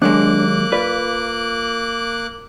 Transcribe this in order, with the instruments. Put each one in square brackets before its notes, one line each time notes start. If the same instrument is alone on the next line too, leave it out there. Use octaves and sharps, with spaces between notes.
[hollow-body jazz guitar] D#2 F#3 G#3 [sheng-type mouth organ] A#3 D6 F#6 [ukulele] D4
[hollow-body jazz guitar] F4 B4 [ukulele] D5